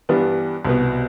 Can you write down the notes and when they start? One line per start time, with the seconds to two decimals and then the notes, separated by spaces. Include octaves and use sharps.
0.09 G2 E3 G3 B3 D4
0.65 C2 B2 B3